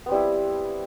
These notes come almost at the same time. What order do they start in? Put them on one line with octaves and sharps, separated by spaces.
B3 C4 G3 E4